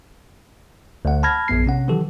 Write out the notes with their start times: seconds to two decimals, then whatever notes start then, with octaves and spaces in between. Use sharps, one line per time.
1.05 D2 F#5
1.23 A5 B5 F6 G#6 A#6
1.48 A#1 F#2 B3 C7
1.66 C3 C#4 F#5
1.88 D#3 E3 F#3 G4 A4